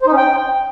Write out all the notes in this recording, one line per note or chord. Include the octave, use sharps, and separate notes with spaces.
C5
D#4
C#4
G5